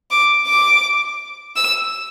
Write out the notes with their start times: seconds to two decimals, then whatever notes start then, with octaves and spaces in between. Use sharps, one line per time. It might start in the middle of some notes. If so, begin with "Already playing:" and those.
0.11 D6
0.47 D6
1.56 E6